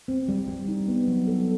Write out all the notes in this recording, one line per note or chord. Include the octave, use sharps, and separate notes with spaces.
C4
G3
G3
D#4
B3
F#3
A4